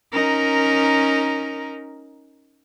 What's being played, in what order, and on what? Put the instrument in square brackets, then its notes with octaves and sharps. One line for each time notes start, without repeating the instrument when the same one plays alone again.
[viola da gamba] C#4 D#4 A#4